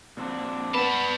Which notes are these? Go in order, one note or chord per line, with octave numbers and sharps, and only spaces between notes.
A#2 C4 D4
G3 B3 B4 A5